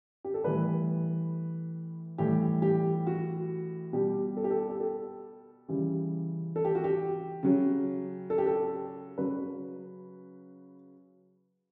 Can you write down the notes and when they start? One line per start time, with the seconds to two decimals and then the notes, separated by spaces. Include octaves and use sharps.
0.25 G4
0.34 A4
0.44 A2 E3 G3 B4
2.18 A2 E3 G3 G4
2.62 G4
3.07 F#4
3.93 B2 G3 G4
4.37 A4
4.44 G4
4.51 A4
4.69 G4
4.80 A4
5.69 C#3 E3 G3
6.56 A4
6.65 G4
6.75 F#4
6.84 G4
7.43 C#3 F#3
8.30 A4
8.38 G4
8.47 A4
9.17 C#3 F#3 B4